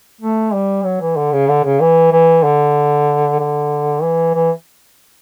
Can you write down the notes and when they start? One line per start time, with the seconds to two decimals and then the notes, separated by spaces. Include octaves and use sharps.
0.21 A3
0.53 G3
0.84 F#3
1.01 E3
1.17 D3
1.32 C#3
1.49 D3
1.64 C#3
1.81 E3
2.12 E3
2.44 D3
3.39 D3
4.03 E3
4.34 E3